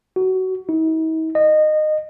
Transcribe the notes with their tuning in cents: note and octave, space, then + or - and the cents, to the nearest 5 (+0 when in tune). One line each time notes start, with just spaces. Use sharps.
F#4 +20
D#4 +45
D#5 -20